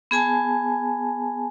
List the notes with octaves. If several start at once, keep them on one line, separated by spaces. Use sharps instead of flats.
B3 G#4 G#5 A5